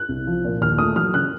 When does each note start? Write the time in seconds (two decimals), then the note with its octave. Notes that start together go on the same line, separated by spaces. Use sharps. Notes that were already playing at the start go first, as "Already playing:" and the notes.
Already playing: F#6
0.09 C2
0.27 F3
0.44 A#2
0.61 D#2 F6
0.78 A3 D#6
0.96 F#3 F6
1.14 C#3 F#6